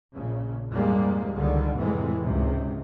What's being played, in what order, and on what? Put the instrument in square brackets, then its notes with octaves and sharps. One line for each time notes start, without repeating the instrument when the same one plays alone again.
[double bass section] A#1 C#3
F2 G#2 G3 G#3 A#3
C#2 D3 D#3 G3
F2 A2 C3 E3 G#3
C#2 G#2 C3